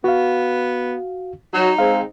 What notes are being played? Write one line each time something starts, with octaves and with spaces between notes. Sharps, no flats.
B3 F#4 F5
F#3 D#4 F#4
G#3 C4 F5